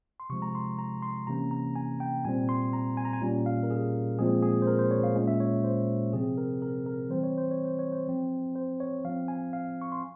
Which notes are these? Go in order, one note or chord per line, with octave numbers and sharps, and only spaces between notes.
C6
C3 F3 G#3 C#6
A#5
C6
A#5
C6
C3 E3 A#3 C#4 A#5
A#5
G#5
G5
A#2 G3 C4 G#5
C6
A#5
G#5
A#5
G#5
A#2 G3 C#4
F5
A#4
G#4
A#2 F3 G#3 C4 G#4
G#4
C5
A#4
C5
C#5
F5
A#2 G#3 C#4
E5
C#5
C5
C3 F3 C4 G#4
A#4
A#4
A#4
E3 G3 C4 C5
C#5
C5
C#5
C5
C#5
C5
F3 C4
C5
C#5
F3 C4 F5
G#5
F5
C#6
C6